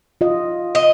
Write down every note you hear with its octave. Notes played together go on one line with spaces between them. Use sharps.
F4 D#5
D#5